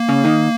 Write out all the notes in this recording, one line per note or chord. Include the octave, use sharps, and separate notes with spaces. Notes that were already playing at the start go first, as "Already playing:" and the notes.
Already playing: A#3
C#3 C#4
D#3 D#4